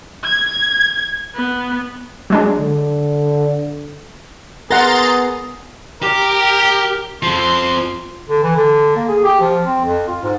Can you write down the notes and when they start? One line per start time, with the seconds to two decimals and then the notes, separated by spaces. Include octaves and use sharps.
0.24 G#6
1.35 B3
2.30 F#3 G#3 D4
2.60 D3
4.71 B3 G#4 A#4 F#5 A#5 C6 A6
6.03 G4 A#4
7.23 F2 F3 C6
8.29 D3
8.43 E3
8.56 D3
8.96 A#3
9.08 G#4
9.24 G4
9.40 F3
9.65 C4
9.84 F2
10.07 F4
10.23 G#2